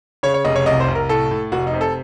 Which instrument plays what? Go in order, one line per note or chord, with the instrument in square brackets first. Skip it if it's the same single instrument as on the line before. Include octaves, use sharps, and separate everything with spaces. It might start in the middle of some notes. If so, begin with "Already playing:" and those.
[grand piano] C#3 C#5
C#5
F1 D#5
C#5
C2 D#5
C5
C2
A#4
A2 A4
A2
F1 F#4
D#4
C3
A4